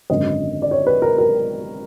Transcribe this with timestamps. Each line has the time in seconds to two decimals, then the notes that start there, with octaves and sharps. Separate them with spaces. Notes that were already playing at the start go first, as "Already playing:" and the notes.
0.10 G#1 F#2 D3 D#5
0.62 D5
0.71 C#5
0.87 B4
1.02 A#4
1.18 A#4